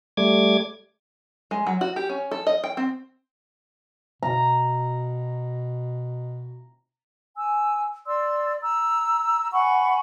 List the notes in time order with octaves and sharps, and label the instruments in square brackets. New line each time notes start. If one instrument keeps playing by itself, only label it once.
[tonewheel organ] G3 A3 D6 G#6
[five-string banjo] G#3
F#3
F#4
G4
C#4
A4
D#5
G5
C4
[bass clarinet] B2 [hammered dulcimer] A#5
[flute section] G#5 E6
D5 C6 E6
A#5 E6
F#5 G#5 B5 C#6